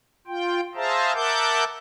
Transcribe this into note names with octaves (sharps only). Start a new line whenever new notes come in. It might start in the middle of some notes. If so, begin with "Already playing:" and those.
F4 G5
G#4 C5 E5 F5 A5 A#5
A#4 E5 F#5 A5 D6 G6